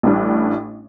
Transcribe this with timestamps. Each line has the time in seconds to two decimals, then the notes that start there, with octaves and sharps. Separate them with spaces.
0.03 A1 A2 G3 D4